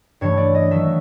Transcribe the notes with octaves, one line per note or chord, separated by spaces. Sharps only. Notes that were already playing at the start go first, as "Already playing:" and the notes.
G2 E3 A3 C#5
D5
D#5
D#3 F#3 A3 E5